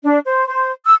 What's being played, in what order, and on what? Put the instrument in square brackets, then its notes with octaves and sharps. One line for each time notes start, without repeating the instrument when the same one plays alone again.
[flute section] D4
C5
C5
E6